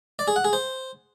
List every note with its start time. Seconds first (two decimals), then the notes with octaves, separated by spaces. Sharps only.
0.19 D5
0.28 G#4
0.36 F#5
0.44 G#4
0.53 C5